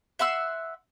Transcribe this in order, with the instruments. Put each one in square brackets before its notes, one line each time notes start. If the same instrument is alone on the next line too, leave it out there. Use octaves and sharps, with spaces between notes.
[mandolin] E5 F#5 C6 E6